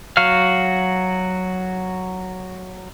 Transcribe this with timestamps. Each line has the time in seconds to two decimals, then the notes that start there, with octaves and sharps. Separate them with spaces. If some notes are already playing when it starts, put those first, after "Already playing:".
0.17 F#3 F#4 F5 F6